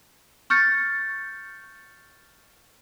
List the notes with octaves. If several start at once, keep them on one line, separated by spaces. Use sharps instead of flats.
C#6 F6 G6 A6 C#7